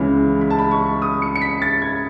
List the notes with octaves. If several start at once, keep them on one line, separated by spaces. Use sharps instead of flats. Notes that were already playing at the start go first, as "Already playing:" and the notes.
Already playing: C#2 C#3 E3
B5
A5
B5
C#6
D#6
C#7
C#7
B6
A6
G#6